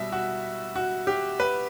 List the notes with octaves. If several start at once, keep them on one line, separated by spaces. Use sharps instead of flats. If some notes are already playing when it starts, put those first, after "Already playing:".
Already playing: B2 G3 E5
F#4
F#4
G4
B4